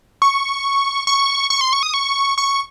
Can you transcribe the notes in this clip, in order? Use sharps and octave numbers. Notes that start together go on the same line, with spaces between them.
C#6
C#6
C#6
C6
C#6
D#6
C#6
C#6